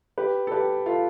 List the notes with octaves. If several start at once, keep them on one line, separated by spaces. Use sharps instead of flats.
G4 B4
A4
G4 B4
F4 A4